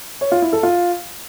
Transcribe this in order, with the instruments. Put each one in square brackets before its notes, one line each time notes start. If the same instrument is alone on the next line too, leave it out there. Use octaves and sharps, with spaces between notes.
[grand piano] C#5
F4
E4
A4
F4